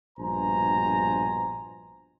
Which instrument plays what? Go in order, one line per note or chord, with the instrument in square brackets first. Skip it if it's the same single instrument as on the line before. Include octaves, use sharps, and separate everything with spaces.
[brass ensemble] A#1 G2 B2 C5 G#5 A#5